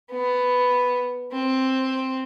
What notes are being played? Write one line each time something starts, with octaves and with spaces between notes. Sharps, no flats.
B3
C4